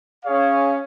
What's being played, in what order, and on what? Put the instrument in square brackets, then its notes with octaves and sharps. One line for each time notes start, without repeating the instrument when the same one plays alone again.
[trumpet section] C#4 G#4 C#5 F5